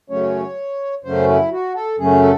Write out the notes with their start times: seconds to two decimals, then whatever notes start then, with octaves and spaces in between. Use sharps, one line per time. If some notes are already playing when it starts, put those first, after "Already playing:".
0.10 F#2 C#3 F#3 A3 C#4 C#5
1.04 F#2 C#3 F#3 A3 C#4 C5
1.28 E4
1.52 F#4
1.75 A4
1.98 F#2 C#3 F#3 A3 C#4 G#4
2.22 A4